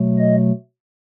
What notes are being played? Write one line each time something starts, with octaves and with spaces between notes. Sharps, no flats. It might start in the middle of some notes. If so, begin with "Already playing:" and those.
Already playing: B2 F#3 A3
D#5